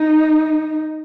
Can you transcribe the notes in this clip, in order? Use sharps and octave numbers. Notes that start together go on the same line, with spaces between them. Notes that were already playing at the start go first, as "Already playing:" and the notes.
Already playing: D#4